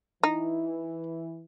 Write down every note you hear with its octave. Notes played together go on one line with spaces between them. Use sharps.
E3 D#4 E4